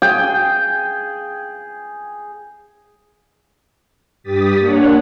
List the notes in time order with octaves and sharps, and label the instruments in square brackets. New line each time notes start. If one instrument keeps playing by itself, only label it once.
[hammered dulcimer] G#4 G5
[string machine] G2 G4 D#6 A6 B6
A#3 D4 C#5 F#5